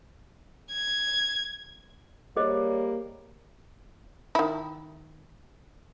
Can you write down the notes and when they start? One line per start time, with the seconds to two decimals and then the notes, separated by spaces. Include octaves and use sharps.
0.73 G#6
2.37 G3 A#3 G#4 C5 C#5 D#5
4.35 D#3 E4